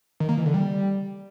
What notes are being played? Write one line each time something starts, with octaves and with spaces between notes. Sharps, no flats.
D#3
A#3
E3
D3
G3